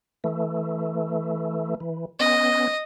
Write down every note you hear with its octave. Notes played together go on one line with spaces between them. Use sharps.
E3 A3
E3
B3 C#4 D#5